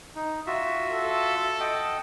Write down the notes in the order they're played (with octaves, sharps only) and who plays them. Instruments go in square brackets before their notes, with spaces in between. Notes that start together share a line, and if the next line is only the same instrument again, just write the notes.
[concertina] D#4
F4 F#4 E5
[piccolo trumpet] A4
[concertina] D#5 F#5 G5